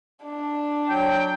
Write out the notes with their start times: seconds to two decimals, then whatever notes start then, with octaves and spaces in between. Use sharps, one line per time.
0.24 D4
0.89 F#3 G5